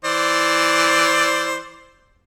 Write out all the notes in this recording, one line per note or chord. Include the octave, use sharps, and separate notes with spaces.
E3 C5 D5